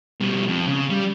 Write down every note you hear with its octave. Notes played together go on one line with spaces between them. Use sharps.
B2 G3
F2
C#3
G3